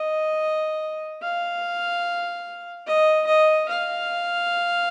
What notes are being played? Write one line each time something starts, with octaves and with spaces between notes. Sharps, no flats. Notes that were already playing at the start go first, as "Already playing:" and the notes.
Already playing: D#5
F5
D#5
D#5
F5